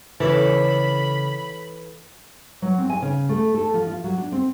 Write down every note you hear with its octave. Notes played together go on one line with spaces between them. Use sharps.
C#3 E3 A4 C#5 B5 D6 F6
F#3
C4
G#5
C#3
A3
A4
F3
F4
F#3
D4
C4